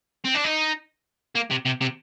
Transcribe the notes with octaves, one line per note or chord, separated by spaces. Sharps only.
C4
D4
D#4
A#3
C3
C3
C3